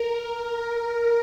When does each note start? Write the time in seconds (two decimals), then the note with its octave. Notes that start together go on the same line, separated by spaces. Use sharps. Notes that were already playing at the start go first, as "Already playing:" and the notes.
Already playing: A#4
0.43 A#4